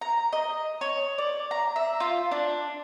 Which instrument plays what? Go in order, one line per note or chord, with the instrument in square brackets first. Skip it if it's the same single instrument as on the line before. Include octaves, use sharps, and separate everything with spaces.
[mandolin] A#5
D#5
C#5
D5
A#5
E5
F4
D4